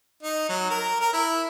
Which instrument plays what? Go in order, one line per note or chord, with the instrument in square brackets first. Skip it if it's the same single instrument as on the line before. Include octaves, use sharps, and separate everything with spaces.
[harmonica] D#4
F#3
A#4
A#4
E4